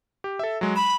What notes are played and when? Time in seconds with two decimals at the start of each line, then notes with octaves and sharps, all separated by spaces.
0.24 G4
0.39 A4 E5
0.61 F#3 G#3
0.76 B5 E7